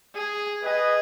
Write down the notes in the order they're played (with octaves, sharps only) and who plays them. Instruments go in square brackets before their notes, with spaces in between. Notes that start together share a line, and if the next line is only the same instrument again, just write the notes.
[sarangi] G#4
[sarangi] G#4 [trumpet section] B4 D#5